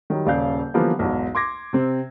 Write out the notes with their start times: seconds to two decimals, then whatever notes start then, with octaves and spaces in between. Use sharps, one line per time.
0.10 D#3 F#3 G3
0.26 D#1 C#3 D5 F5 G6
0.74 D3 E3 F3 G3 A#3 B3
0.99 B1 E2 G#2
1.35 C6 D6 G#6 A#6
1.73 C3 C4